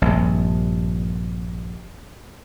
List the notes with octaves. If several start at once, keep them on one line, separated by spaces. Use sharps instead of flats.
A#1 G2 C3